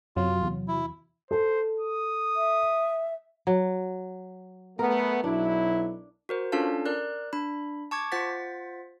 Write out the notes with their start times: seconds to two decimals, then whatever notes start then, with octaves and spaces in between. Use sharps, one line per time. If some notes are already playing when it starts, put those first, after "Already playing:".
0.16 F#2 C3 F#3 F4
0.43 E2
0.68 E4
1.31 A4 C5
1.80 D#6
2.36 E5
3.47 F#3
4.79 A3 B3 A#4
5.24 B1 F#3 D4 E4
6.29 F#4 A#4 C5
6.52 C#4 D4 F4 A4 F5 A5
6.86 A#4 D5 F#6
7.33 D4 B5
7.91 A5 C#6 D6 G#6
8.12 F4 C5 F#5 A6 B6